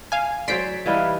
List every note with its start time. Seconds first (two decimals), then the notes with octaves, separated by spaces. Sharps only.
0.12 F5 G#5
0.48 F#3 C5 D5 C6 B6 D7
0.86 E3 G3 D#4 B4 E5 F5